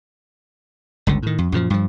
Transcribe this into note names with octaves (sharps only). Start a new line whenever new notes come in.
G1 C#2 D3
A2 D#3
F2
F#2 A#2 C#3 F3
G2 F3